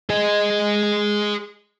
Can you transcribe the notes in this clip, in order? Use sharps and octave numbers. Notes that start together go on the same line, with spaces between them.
G#4 D#5